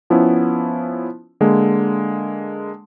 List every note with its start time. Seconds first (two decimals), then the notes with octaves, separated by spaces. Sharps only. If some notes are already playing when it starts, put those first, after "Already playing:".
0.10 F3 B3 C#4 E4
1.41 D3 G#3 A#3